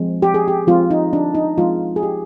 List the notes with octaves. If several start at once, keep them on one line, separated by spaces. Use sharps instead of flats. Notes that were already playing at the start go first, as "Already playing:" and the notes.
Already playing: F3 G#3 C4
G4
G#4
G4
F3 G#3 C4 F4
D#4
D4
D#4
F3 G#3 C4 F4
G#4
G4